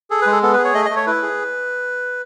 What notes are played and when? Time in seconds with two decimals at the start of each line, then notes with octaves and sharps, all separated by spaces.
0.10 G#4 A4
0.22 B4
0.26 G#3
0.32 A4
0.43 B3 A4
0.53 B4
0.58 G#4
0.64 C#5
0.74 A3 D#5
0.85 D#5
0.90 A3
0.96 C#5
1.07 E4 B4
1.22 G#4